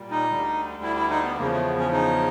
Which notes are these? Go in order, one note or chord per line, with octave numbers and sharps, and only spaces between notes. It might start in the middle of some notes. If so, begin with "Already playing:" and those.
Already playing: A#2 G3
D#4
D2 D3 G3
E4
E4
D#4
B3
E2 C#3 F3 A#3
A3
B3
C#4
D#4